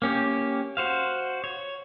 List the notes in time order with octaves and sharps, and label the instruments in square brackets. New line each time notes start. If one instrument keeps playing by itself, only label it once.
[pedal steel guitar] A#3 C#4 G4
F#4 C5 F5
C#5